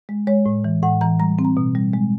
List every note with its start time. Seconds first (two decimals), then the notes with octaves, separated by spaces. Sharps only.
0.09 G#3
0.27 G#3 C#5
0.46 A2
0.64 E3
0.83 A2 F#5
1.01 E3 A#5
1.20 G3 A#5
1.39 C4
1.45 A#5
1.57 B2
1.75 G3
1.93 G#3